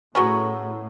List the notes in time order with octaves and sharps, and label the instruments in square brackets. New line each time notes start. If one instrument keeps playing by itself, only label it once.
[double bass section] A2 [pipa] F#3 B3 C#4 [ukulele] F#4 G#4 B5